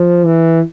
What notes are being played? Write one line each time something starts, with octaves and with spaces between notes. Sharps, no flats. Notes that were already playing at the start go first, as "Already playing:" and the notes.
Already playing: F3
E3